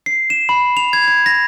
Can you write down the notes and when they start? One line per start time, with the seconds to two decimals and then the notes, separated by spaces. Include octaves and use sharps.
0.06 C7
0.30 E7
0.49 B5
0.77 F7
0.93 G#6
1.08 G#6
1.26 A#6